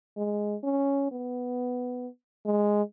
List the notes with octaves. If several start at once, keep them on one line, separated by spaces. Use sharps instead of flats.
G#3
C#4
B3
G#3